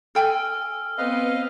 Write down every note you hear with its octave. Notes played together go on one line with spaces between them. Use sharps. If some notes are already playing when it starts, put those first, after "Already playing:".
A4 G5 G#5 E6 F6
B3 C4 B4 D#5 F5